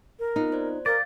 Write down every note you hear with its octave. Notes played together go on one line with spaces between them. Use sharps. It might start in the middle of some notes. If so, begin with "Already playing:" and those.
A#4
B3 C4 D#4 F4
C5 D5
A#4 D5 F5 G6